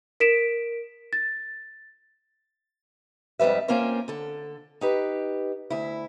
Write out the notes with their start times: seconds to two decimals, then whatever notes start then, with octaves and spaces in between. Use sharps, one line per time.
0.20 A#4 B6 D7 E7
1.13 A6
3.39 F2 G#2 G3 B4 E5
3.68 A#3 C4 C#4 F4 A#4 C5
4.08 D3 A4
4.81 D#4 G4 B4
5.70 D2 E4